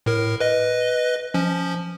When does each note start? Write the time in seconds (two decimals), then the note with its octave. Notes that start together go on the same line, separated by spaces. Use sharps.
0.06 A2 A#4
0.40 B4 D#5
1.34 F3 C#4